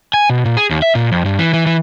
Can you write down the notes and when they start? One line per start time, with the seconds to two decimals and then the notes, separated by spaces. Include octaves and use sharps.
0.14 G#5
0.30 B2
0.45 A#2
0.57 G#4
0.71 D#2
0.82 E5
0.95 A#2
1.12 F2
1.25 G2
1.39 E3
1.53 E3
1.66 E3